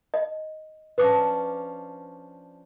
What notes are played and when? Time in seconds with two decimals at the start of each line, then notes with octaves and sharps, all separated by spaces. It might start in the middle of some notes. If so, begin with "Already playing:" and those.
0.14 D#5
0.98 F3 C#4 D4 B4 D6